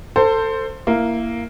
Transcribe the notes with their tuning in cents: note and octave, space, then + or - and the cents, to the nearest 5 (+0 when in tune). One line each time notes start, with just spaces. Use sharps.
A4 +25 C5 +0
A#3 +0 E4 +15